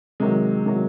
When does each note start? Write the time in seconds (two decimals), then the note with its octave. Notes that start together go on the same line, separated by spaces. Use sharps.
0.20 C3 D#3 F#3 G#3
0.66 C3 D#3 F#3